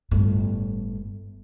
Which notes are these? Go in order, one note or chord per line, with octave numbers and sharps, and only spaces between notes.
G1 A2